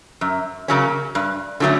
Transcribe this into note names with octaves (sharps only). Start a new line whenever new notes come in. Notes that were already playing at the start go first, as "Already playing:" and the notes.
F#2
C#3 F#3 A#3 C#4
G2
D3 F#3 A3 C#4